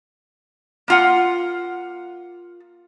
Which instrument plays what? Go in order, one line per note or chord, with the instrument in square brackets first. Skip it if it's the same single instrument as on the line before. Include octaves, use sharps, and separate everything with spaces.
[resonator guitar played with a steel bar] A#3 F4 F#5